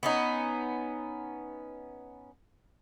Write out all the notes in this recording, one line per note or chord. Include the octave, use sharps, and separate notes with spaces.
B3 C#4 D#4